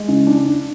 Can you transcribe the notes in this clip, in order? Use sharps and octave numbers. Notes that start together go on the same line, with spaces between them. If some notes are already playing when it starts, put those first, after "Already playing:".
Already playing: G#3
C#3
D4
D4